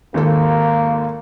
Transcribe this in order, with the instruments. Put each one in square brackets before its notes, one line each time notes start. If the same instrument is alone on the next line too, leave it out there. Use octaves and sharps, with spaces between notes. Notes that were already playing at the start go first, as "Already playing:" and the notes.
[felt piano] G#1 D#2 A4 [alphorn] A#3